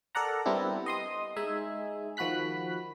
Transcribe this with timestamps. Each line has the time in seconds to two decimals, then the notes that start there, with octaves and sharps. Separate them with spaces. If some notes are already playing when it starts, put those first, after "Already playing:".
0.15 A4 A#4 D5 F#5 A#5
0.45 G3 B3 C4 D4 E4 G4
0.86 D#5 C6 D#6
1.36 G#3 D#4 E5 G#5
2.17 D#3 F3 F#4 B5 F#6 B6